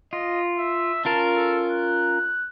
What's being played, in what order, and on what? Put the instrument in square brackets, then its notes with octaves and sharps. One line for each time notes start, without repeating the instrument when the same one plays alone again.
[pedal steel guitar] F4 [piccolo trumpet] D#5
[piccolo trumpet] E5
[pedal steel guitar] C#4 F4 A#4 [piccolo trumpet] A5
[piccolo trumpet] A4
F#6